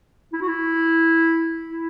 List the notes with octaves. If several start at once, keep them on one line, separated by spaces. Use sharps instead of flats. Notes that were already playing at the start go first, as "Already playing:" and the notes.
E4
F#4
E4
E4